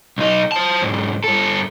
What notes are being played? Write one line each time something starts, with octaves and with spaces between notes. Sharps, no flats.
B1 D#4
C5 A5
E2 G#2
G2 A4